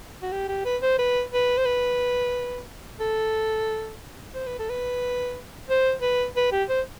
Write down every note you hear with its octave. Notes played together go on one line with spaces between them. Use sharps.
F#4
G4
G4
B4
C5
B4
B4
C5
B4
A4
C5
B4
A4
B4
C5
B4
B4
G4
C5